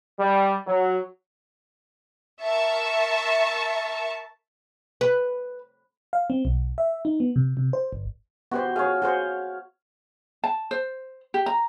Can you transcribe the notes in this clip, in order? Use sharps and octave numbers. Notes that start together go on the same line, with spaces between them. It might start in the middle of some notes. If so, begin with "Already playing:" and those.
G3
F#3
A#4 E5 A5 C#6
B4
F5
C4
B1
E5
D#4
B3
C3
C3
C5
G1
B3 F#4 G4 C5
G#4 C#5 F5
F#4 G#4 C5
A5
C5
G4
A#5